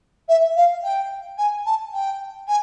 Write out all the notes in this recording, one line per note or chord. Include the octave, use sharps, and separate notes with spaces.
E5
F5
G5
G#5
A5
G5
G#5